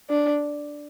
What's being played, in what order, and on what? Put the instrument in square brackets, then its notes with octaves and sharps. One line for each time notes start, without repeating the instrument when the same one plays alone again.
[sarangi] D4